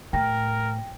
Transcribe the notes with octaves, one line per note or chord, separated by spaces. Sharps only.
A2 A#4 G5 A#6